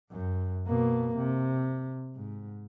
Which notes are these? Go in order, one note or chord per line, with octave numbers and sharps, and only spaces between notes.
F#2
B2 A#3
C3
G#2